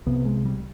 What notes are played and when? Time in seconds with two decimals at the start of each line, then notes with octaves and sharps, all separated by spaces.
0.06 C2 C3 B3
0.25 G#3
0.45 G3